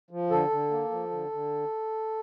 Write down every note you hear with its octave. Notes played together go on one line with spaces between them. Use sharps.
F3
D3 A4
D3
A#3
F3
D3
D3